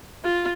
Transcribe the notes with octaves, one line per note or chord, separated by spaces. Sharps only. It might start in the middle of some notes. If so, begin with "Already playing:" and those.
F4